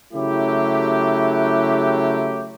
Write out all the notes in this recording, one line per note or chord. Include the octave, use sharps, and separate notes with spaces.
C#3 F#3 A3 E4 G4